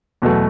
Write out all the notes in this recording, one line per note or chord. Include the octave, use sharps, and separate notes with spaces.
E2 B2 F#3 A3